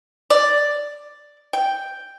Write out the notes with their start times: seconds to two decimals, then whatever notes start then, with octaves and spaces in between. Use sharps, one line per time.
0.30 D5
1.53 G5